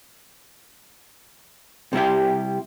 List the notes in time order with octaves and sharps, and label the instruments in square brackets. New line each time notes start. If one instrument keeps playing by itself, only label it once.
[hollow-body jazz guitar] C3 G3 E4 G4